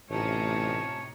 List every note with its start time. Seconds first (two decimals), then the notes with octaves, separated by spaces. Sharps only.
0.10 A1 A2 C3 C#4 D#4 F4 C#5 A5